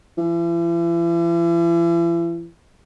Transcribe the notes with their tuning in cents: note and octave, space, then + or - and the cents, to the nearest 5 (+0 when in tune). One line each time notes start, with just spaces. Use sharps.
E3 +40